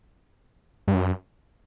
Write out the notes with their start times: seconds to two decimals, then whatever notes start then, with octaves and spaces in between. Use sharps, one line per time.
0.88 G2
0.94 F#2